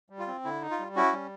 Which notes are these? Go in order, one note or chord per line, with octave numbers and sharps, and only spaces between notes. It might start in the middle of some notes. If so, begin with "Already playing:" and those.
G3
F4
C4
D3 E4
D#4
F4
G3
C#4 E4 F#4
G3